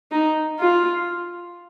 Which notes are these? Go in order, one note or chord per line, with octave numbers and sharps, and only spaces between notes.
D#4
F4